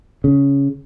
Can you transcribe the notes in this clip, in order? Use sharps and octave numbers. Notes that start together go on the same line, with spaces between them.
C#3